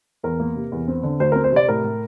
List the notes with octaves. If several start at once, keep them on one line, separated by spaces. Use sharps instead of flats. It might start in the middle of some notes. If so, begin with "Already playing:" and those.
E2 A#4
A#3
C3
E2
C4
D3
D2 C5
A#4
C4
C5
C3 D5
A2 A#4
A2